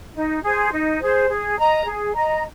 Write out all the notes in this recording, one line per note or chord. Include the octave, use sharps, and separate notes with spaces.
D#4
G#4 C5
D#4
G#4 C5
G#4
D#5 A#5
G#4
D#5 A#5